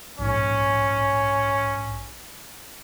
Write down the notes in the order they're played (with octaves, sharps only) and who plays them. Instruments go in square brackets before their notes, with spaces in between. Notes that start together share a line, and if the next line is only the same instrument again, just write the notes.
[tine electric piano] A#1 G#2 [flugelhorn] C#4